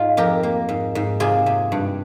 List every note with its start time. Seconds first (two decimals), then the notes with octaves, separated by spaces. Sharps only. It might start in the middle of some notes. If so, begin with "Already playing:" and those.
Already playing: G#2 D#4 F4
0.17 F2 G4 A#4
0.43 A#3
0.69 G#2
0.95 G#2
1.20 C3 F4 G#4
1.46 C3
1.72 G2